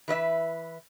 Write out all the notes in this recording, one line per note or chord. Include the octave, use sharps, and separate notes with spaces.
E3 B4 D#5 E5